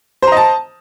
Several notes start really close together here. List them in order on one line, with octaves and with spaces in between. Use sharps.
C5 A#5 D#5 A5